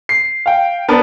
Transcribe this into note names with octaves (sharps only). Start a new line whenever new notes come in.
C7
F5 G5
B3 C4 D4 A#4